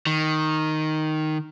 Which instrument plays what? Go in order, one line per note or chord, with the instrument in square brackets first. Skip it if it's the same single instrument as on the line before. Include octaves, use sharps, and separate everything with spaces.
[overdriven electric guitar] D#3